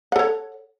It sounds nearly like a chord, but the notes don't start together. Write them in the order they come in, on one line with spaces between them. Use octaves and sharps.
F#5 A4 C#5